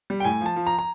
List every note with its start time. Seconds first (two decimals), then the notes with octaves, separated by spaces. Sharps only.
0.10 G3
0.20 G5
0.25 A2 G#5
0.41 F3
0.46 A5
0.56 F3
0.67 A#5
0.79 A#5